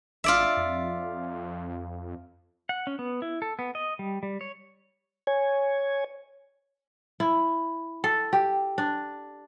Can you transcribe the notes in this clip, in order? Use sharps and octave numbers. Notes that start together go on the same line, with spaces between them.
G#1 F4 D5 E5
F2
F#5
C#4
B3
E4
A4
B3
D#5
G3
G3
C#5
C#5 G#5
E4
A4
G4
D4